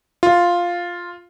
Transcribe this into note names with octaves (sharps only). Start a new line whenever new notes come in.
F4